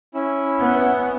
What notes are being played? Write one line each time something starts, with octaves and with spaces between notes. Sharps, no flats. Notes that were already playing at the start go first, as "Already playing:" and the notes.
C#4 E4
B3